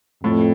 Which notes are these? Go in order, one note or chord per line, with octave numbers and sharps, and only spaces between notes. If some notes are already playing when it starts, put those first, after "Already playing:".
F2 A2